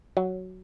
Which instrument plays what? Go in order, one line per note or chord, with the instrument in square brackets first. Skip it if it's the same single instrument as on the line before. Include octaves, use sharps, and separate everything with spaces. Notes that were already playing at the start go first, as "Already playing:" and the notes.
[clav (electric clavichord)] F#3